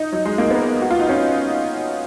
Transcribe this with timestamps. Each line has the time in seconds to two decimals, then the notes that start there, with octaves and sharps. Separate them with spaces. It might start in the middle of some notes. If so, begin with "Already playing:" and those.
Already playing: D#4
0.12 F#3
0.25 G#3
0.38 A#3
0.51 B3
0.82 F#4
0.91 F4
0.99 D#4
1.09 C#4